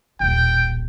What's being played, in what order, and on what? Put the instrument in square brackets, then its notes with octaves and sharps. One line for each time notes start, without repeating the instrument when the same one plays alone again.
[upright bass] D#1 B1 [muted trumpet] G5